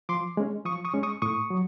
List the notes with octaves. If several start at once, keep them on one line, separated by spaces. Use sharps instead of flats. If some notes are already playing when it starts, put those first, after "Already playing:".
F3 C6 D6
G#3 C#4
F3 C#6 D#6
C#6 D#6
G#3 C#4
C#6 D#6
A2 C#6 D#6
F#3